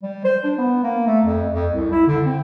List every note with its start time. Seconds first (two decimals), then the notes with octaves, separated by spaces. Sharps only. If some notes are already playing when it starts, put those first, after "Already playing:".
0.03 G3
0.24 C5
0.44 D4
0.58 B3
0.84 A#3
1.07 A3
1.25 F2
1.53 F2
1.73 C2
1.92 E4
2.07 D3
2.26 C4